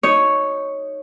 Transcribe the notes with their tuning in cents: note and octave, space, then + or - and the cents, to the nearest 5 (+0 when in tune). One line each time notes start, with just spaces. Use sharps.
D#4 +0 C#5 +0